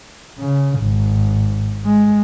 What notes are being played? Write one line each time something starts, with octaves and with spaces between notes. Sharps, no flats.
C#3
G#1
G#3